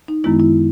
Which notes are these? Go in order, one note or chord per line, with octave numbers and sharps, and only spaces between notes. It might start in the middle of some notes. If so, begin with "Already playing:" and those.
D#4
F#2 D#3 G#3 B3 E4
E4